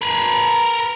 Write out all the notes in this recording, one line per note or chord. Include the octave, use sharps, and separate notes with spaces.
A#4 B4